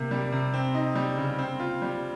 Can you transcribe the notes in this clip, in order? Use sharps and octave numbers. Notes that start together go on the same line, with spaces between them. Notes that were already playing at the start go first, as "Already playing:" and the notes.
Already playing: C3 A#3
G3
C3
C4
D#4
G3
C#3
C4
F4
G3